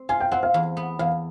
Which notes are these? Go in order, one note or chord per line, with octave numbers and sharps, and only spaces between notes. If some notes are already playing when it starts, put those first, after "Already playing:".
Already playing: C4
F4 G#5
G5
C4 F#5
F5
E2
B3
E2 F5